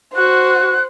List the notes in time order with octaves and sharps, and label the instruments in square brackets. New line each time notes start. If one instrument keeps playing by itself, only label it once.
[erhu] F#4 [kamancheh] C5 [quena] F#6